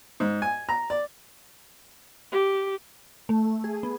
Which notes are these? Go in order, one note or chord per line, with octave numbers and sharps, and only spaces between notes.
G#2
G#5
A#5
D5
G4
A3
G#4
B3